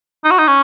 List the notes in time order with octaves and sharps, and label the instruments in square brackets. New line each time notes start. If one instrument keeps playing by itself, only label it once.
[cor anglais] D#4
F#4
D#4
C#4